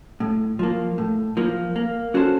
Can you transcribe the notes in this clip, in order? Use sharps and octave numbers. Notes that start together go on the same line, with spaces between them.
A2
F3 A#3
A2
F3 A#3
A#3
C#4 F#4 A4 C5